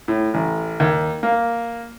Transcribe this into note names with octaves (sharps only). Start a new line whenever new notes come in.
A2
A1
D#2
A#3